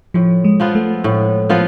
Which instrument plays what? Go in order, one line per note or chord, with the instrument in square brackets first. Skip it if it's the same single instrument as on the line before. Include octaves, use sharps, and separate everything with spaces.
[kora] A2 [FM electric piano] F3
[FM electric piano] G#3
[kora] F3 B3 F4
[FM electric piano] A3
[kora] A2
F3 B3 F4